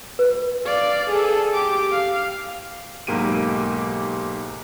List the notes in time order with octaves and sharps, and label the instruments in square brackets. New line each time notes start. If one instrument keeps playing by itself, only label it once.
[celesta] B4
[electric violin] D5 F5
G#4 A4
G4 D6
F5
[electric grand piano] B1 G#2 A#3 G4 D7 D#7